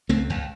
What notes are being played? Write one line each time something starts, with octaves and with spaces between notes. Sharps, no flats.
C#2 A3 C4
C#2